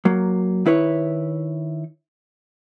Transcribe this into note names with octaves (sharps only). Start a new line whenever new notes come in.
F#3 A#3
D#3 E4 B4 C#5